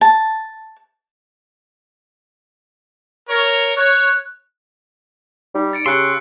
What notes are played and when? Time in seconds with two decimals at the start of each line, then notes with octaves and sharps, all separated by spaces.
0.01 A5
3.30 A#4 C#5
3.77 C#5 F#6
5.55 G3 D#4
5.73 A6 C#7 D7
5.86 C#3 G4 C6 E6 F#6 C#7